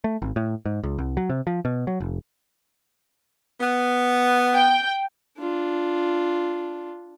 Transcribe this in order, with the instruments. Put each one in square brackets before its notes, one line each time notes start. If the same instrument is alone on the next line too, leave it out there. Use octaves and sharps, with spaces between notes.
[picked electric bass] A3
G#1
A2
G#2
C#2
C2
F#3
C3
F3
B2
F#3
F1
[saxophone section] B3
[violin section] G5
[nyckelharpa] D4 F4